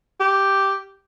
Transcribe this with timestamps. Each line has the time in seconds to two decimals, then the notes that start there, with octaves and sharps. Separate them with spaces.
0.20 G4